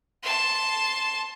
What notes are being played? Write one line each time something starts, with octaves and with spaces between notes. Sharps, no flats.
A5 C6